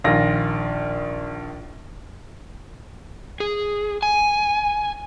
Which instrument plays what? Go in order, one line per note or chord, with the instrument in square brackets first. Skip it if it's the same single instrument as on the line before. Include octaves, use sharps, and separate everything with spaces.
[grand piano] A#1 D#3 F4 A#6
[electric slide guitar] G#4
G#5